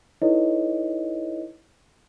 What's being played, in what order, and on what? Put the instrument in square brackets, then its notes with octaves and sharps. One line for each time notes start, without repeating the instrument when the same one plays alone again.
[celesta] D#4 E4 A4 B4 C#5 D#5